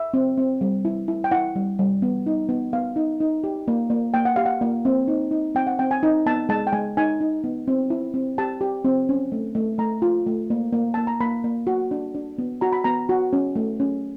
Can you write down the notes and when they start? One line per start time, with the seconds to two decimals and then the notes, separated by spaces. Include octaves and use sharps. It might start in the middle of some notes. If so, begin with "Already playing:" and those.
Already playing: E5
0.14 C4
0.38 C4
0.61 G3
0.85 E4
1.08 E4
1.24 G5
1.31 E4 F#5
1.56 G3
1.79 G3
2.02 B3
2.26 D#4
2.49 B3
2.73 B3 F5
2.96 D#4
3.20 D#4
3.44 G4
3.68 A#3
3.90 A#3
4.14 A#3 G5
4.25 F#5
4.36 G4 F5
4.46 F#5
4.61 A#3
4.85 C4
5.08 D#4
5.31 D#4
5.55 C4 G5
5.67 F#5
5.79 C4 G5
5.91 G#5
6.03 D#4
6.26 B3 A5
6.49 G#3 A5
6.67 G5
6.72 G#3 G#5
6.97 D#4 G#5
7.21 D#4
7.44 B3
7.68 C4
7.90 E4
8.14 C4
8.38 G4 A5
8.61 G4
8.85 C4
9.09 C#4
9.32 A3
9.55 A3
9.78 A3 A#5
10.02 F4
10.26 A3
10.50 A#3
10.73 A#3
10.94 A#3 A5
11.07 A#5
11.20 A#3 B5
11.44 A#3
11.67 F#4
11.91 D4
12.15 D4
12.38 B3
12.61 F#4 A#5
12.72 B5
12.84 B3 A#5
13.09 F#4
13.33 C#4
13.56 A3
13.80 C#4